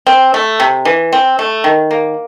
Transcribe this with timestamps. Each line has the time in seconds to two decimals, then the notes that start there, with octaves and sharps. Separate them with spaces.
0.07 C4
0.34 A3
0.60 C3
0.85 E3
1.13 C4
1.39 A3
1.64 D#3
1.91 A#3